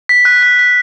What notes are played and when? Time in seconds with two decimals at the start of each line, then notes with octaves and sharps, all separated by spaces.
0.09 B6
0.25 F#6
0.43 B6
0.59 B6